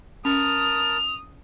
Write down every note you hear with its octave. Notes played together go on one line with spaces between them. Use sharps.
C#4 A#4 A5 D#6 F7